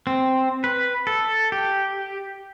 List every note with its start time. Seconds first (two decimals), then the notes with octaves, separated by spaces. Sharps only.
0.07 C4
0.64 B4
1.07 A4
1.52 G4